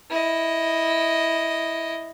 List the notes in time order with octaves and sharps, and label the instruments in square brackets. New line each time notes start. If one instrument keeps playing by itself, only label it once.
[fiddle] E4 D#5